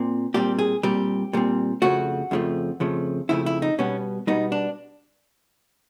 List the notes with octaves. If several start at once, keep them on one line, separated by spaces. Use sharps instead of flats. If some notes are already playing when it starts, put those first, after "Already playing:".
Already playing: A#2 C4
A#2 G3 C4 G4
G#4
A#2 G3 C4 G4
A#2 G3 C4
F2 C#3 F3 A3 F#4
F2 C#3 F3 A3
F2 C#3 F3 A3
F2 C#3 F3 A3 E4
E4
D#4
B2 G3 B3 C#4
B2 G3 B3 D#4
D4